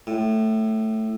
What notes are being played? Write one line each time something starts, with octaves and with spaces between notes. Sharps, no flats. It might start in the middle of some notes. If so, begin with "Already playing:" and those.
A2